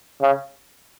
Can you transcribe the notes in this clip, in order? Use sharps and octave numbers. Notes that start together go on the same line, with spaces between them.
C#3